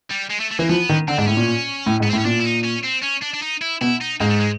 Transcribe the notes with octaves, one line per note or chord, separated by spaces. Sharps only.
G3
G#3
A3
A3
E3 A#3
F3 B3
D#3
D3 C4
G#2 D4
A2 C#4
A#2
A2
G#2
B3
C4
A2
C#4
A#2 D4
E4
D#4
C#4
C4
C#4
D4
D4
D#4
E4
B2 E4
D#4
G#2 A#3
A3
G#3